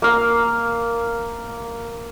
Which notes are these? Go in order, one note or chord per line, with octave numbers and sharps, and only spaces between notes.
A#3 F5